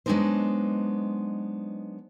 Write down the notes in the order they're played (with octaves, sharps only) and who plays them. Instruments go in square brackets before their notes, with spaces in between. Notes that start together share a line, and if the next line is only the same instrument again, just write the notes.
[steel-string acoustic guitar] F#3 G#3 B3 D4 D#4 C5